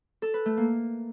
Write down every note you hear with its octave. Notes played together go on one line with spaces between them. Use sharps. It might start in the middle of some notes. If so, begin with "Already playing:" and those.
A4
B4
A3
A#3